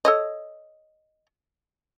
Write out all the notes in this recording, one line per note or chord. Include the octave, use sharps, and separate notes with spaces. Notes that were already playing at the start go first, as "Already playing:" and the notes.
A4 C#5 D#5